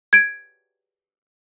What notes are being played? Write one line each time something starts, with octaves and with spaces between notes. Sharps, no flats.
G#6 D7